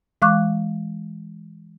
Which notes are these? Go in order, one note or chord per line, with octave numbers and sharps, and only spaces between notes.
E3 G#3 F5 C#6 D6 F#6